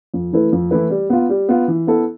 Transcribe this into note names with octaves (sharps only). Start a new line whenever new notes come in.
F2
E3 A3 E4 B4
F2
E3 A3 E4 B4
G3
B3 F4
G3
B3 F4
E3
B3 E4 A4